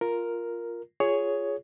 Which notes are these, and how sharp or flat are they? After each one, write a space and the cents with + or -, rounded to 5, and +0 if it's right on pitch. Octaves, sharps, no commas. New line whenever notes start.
F4 +0 A#4 +0
F4 +0 G#4 +0 C#5 +10